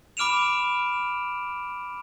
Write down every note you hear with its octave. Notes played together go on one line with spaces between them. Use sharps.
B5 D6 F6 D7 E7 F7